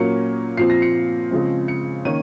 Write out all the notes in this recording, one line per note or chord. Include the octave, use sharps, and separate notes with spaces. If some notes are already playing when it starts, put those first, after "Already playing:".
Already playing: A#2 F#3 A#3 C#4 C#7
A#2 F3 C4 C7
A#6
C#7
C#3 F3 G#3 C4
C#7
D#3 A#3 C#4 D#7